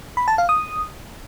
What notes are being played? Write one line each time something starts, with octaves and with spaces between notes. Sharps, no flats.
B5
A5
F5
D#6